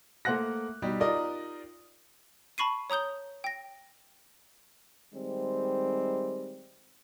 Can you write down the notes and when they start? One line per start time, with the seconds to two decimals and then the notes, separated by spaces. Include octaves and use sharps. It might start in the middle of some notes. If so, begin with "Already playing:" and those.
0.25 A3 A#3 C5 F#5 F#6 A#6
0.82 B2 G3 D#4 G4
1.00 D#4 F4 G4 A#4 D5 D#5
2.58 A5 B5 C#6 C7 D#7
2.90 C#5 A#5 D#6 G6 G7
3.44 G5 A#6
5.14 D#3 G3 G#3 C4